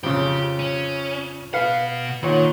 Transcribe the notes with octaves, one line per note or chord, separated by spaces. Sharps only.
F2 C#3 G4
C#4
B2 B4 F5 F#5
A#2 D#3 C#5 F#5